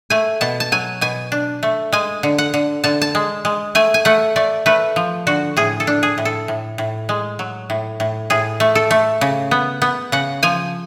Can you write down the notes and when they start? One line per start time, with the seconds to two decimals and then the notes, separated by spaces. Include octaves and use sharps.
0.10 A3 G#5
0.41 B2 A5
0.60 A5
0.72 F#3 G#5
1.01 B2 G#5
1.32 D4
1.63 A3
1.92 G#3 G#5
2.23 D3
2.38 F#5
2.54 D3
2.84 D3 A5
3.02 A5
3.15 G#3
3.45 G#3
3.75 A3 G#5
3.94 G#5
4.05 A3 F#5
4.36 A3 D5
4.66 A3 B4
4.96 F3
5.27 D3 F#4
5.57 A2 G#4
5.80 A4
5.87 D4
6.03 G#4
6.18 A2
6.25 A4
6.48 A2
6.78 A2
7.09 G#3
7.39 F#3
7.70 A2
8.00 A2
8.30 A2 G#4
8.60 A3
8.75 A4
8.91 A3
9.21 C#3
9.51 B3
9.82 B3
10.12 C#3 F#5
10.43 F3 G#5